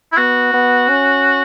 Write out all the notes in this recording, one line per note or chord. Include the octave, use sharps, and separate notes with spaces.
E4
B3 F#4
B3
C#4